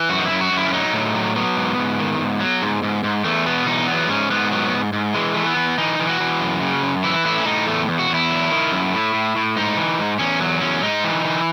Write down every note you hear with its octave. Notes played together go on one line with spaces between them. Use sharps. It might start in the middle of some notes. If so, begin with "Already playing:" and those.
Already playing: E3
F#2 F#4
D#4
E4
F#2
F#4
F#2
E4
C#4
F#3 D#4
A2
F#3
F#3 B3
G#2
G#2
D#3
G#2
F#3
G#2
G#2
G#2
E2 A3
B2 B3
E2 D#4
F#3 B3
G#2 C#4
G#2 B3
F#3 B3
G#2
G#2
E3 G#3
E3 A3
B3
E3
E3 D#4
E3
F#4
E3
F#2
C#3
F#2
E3 E4
A2 E4
C#4
A2 D#4
E2 A3
E2
F#4
E2 E4
F#3
D#3
F#2
A2
A2
A2
G#2 D#4
E3
G#2
E2 C#4
F#3
E2 C#4
G#2 D#4
E3
E3